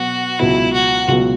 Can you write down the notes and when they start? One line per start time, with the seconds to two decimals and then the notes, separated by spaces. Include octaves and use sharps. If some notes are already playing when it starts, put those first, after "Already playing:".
Already playing: B2 F#3 B3 F#4
0.39 C#2 B2 F#3 B3 E4
0.73 F#4
1.08 C#2 B2 F#3 B3